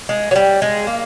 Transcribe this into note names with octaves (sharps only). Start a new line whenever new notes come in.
G#3
F#3
G3
G#3
A#3